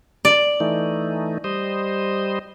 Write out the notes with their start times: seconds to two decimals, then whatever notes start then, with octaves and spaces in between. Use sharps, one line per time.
0.25 D5
0.60 E3 A3 D#4
1.44 G3 C5 D#5